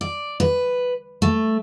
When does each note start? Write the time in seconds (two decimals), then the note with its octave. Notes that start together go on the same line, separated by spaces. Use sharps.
0.01 D5
0.40 B4
1.22 A3